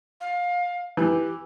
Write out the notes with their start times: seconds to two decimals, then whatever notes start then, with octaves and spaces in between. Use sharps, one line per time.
0.21 F5
0.97 E3 G4